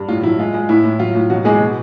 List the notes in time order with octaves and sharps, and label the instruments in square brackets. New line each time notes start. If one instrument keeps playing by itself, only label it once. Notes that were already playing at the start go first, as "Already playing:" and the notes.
Already playing: [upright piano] G2
A2 F4
F#3 E4
G#3 F4
G#3
A2 E4
A2
F#3 F4
A2
B2 F#3 F#4
E2 G#3 G#4
B2